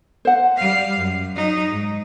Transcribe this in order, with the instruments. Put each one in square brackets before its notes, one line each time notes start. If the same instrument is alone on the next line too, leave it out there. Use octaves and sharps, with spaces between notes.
[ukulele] C5 F#5
[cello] G3 F5
F#2
F#3 D#4
G#2